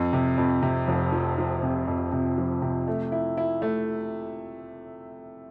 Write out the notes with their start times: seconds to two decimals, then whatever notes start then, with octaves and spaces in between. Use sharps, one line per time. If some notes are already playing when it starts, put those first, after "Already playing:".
Already playing: F2
0.13 C3
0.38 F2
0.62 C3
0.88 F1
1.12 F3
1.38 F3
1.63 C3
1.87 F2
2.12 C3
2.38 F3
2.62 C3
2.88 A3
3.12 E4
3.37 E4
3.62 A3